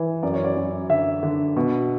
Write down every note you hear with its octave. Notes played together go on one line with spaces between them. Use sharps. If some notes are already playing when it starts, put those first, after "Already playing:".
Already playing: E3
F#2 D5
C#5
D5
F#2
D3 E5
D3
B2